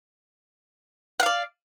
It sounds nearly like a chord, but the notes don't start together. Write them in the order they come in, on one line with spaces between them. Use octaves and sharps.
F#5 F5 D5